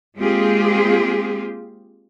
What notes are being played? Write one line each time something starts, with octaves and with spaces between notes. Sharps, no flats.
G#3 A#3 C4 F4 G4 G#4